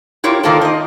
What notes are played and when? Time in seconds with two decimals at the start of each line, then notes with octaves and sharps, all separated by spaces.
0.24 E4 F4 G4 A#4 C#5
0.43 D#3 A#3 F4 A4 A#4 C5
0.61 C5 D#5